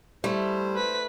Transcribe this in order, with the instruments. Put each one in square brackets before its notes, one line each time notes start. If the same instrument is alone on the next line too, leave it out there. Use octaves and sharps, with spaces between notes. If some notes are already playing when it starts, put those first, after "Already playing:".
[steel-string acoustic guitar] G3 [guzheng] A3 E4 [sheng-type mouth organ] C5
[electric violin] B4 B6